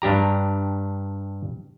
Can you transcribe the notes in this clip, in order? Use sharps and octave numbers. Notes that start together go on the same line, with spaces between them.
G2 D4 G4 A#5